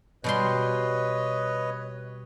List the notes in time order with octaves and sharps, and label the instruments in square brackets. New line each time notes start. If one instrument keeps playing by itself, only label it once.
[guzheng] B2 G3 C6 [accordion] B4 C#5 D#5